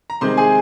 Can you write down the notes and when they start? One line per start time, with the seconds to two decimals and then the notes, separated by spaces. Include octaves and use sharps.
0.10 A#5
0.21 C3 D#3 G#3 C5 C6
0.37 G#4 G#5